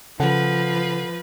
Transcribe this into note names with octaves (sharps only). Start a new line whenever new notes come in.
C#3 F3 A4 B4 F#5